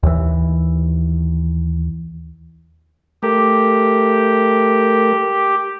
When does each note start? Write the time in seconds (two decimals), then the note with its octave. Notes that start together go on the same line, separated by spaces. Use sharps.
0.03 D#2 E3
3.23 A3 G4 A#4